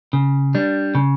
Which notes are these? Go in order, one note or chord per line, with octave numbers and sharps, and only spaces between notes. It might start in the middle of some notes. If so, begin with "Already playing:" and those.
C#3
G3 D4
C#3